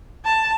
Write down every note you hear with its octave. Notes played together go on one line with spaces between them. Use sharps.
A5